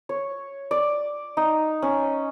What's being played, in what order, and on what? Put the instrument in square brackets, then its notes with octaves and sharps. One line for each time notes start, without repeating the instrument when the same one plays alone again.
[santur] C#5
D5
D#4
C#4